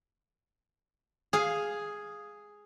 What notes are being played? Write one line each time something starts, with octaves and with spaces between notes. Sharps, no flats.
G#4 F5 G#5